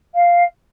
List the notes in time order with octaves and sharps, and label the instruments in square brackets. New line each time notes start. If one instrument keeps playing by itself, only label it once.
[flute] F5